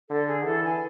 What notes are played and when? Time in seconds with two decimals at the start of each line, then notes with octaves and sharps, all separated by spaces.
0.10 D3 A4
0.27 G#4
0.45 E3 A4
0.63 G#5